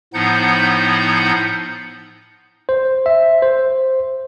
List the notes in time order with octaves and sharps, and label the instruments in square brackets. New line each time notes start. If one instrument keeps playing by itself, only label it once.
[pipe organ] A2 F3 B3 D#4 F#5 G6
[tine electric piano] C5
E5
C5